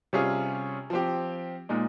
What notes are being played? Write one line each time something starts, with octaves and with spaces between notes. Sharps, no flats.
C3 G3 C#4 F4 G#4
F3 C4 G4
A#2 G#3 D#4